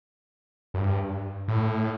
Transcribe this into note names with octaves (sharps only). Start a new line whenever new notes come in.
F#2
G2
A2